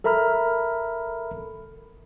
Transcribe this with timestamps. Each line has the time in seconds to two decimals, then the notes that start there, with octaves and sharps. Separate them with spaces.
0.04 A4 A#4 E5 A#5 B5 F6